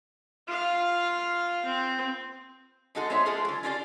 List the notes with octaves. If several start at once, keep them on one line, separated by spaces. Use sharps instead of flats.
F4 F5
C4
D3 G#3 D#4 F#4 A4
G#3 B3 C4 C5 C#5 E5
G#3 A3 B3 F4 G#4 A4
D3 F#3
C#4 D4 F4 G4 B4 D5